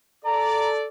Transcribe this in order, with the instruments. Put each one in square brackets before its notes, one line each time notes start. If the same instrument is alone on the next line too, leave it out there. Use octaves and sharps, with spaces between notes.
[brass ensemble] A4 D5 [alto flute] A#5